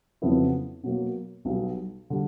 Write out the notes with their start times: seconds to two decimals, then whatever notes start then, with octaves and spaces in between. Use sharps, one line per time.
0.22 F2 C#3 F#3 B3 E4
0.84 B2 F#3 A#3
1.45 B1 B2 G3
2.10 D3 G3